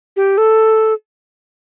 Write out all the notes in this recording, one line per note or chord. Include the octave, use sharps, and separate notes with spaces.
G4
A4